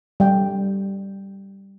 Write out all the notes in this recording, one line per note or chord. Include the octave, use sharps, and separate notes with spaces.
G3 G5